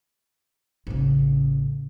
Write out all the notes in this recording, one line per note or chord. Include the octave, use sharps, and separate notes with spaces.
A1 C#3